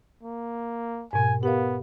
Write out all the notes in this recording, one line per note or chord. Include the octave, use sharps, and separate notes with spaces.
A#3
G#2 B2 G#5
B3 G4 A#4 F5